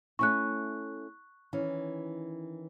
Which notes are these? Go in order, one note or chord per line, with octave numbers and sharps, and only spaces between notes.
A3 C#4 E4 C#6 F#6
D#3 E3 C#4